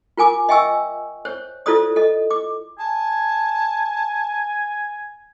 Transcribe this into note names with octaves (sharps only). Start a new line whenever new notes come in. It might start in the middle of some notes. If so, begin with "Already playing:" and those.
F4 A#4 G#5 D6
D#5 E5 G5 G#5 C#6 E6
C5 C#5
E4 F4 A4 C5 D5 D#6
A4 D#5
D6
G#5 A5